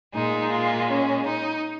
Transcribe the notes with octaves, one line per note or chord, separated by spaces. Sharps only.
A#2 G#3 D#4
F4
C#4
D#4